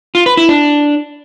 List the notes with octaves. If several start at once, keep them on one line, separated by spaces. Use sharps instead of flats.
F4
B4
E4
D4